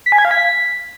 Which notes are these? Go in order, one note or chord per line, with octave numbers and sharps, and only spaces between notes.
B6
G#5
G#6
F5
B6